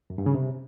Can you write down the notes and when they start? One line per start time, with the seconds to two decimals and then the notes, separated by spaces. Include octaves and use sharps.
0.10 F#2
0.18 G2
0.26 C#3
0.34 C3